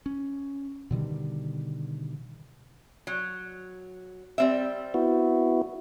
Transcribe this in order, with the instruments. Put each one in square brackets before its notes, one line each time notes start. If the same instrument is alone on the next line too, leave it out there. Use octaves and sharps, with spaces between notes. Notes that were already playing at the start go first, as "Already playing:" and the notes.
[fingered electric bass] C#4
B2 D3 D#3 G3
[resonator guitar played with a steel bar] F#3
G3 C4 E5
[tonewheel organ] B3 E4 F#4